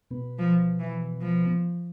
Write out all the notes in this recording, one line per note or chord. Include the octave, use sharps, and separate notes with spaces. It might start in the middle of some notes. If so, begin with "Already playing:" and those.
B2 B3
F3
E3
F3